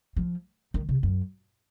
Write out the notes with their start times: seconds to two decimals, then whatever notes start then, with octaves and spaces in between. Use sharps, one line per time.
0.16 F3
0.74 D#3
0.89 C3
1.03 F#2